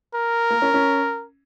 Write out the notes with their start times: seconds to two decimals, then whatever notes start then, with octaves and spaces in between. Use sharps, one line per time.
0.15 A#4
0.50 A#3
0.62 C#4
0.74 C#4